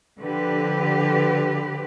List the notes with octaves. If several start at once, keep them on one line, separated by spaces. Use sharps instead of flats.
D3 F3 G4 B4